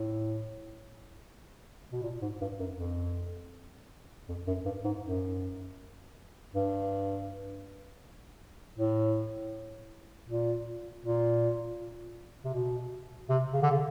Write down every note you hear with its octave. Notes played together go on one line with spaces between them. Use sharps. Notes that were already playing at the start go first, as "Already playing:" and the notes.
Already playing: A2
B2
A#2
G#2
G2
F#2
F2
F2
F#2
G2
G#2
F#2
G2
A2
A#2
A#2
C3
B2
C3
C#3
D3
C#3